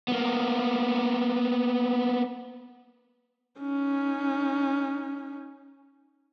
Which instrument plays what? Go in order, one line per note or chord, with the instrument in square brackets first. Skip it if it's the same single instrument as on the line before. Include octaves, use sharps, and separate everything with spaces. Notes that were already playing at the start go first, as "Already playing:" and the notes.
[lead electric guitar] A#3 B3
[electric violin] C#4 D#4